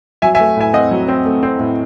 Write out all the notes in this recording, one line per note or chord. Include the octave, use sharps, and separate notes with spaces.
F#3 E5 G#5
E5 G#5
A3
A2 E5 G#5
C4 D#5 F#5
F#3
C4
A3
C4
A2